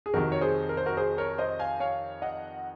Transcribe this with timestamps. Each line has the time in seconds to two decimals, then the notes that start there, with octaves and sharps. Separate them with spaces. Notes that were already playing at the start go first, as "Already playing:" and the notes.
0.06 G#4
0.14 F2 C3 D#3 F#4 A#4
0.32 C#5
0.41 G#4 C5
0.69 A#4
0.77 C5
0.86 F#4 A#4
0.97 G#4 C5
1.18 A#4 C#5
1.38 C5 D#5
1.59 F5 G#5
1.80 C#5 F5
2.22 D#5 F#5